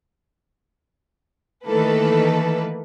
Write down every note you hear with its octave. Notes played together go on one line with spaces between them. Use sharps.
D#3 E3 A3 A#3 A4 B4